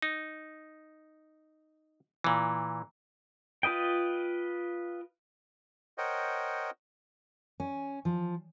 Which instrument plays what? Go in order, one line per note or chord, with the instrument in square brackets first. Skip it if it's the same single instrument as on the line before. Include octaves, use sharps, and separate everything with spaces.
[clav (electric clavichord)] D#4
A#2 E3
[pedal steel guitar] F4 B4 D#5 G5
[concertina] A#4 C5 C#5 D#5 F#5 G5
[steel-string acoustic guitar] C#4
F3